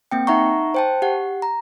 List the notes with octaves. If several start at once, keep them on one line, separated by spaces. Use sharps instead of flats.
A#3 C4 G5
D#4 E5 F#5 A#5 C#6
C5 G5 A5
G4 F#5
A#5